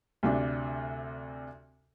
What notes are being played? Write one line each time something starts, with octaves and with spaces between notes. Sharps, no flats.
D2 C3 D4